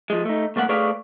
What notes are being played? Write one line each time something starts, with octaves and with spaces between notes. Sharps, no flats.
F3 G#3
A3 D#4
C2 A3 A#3 C#5 F#5
A3 G#4 B4 C#5 D5 F5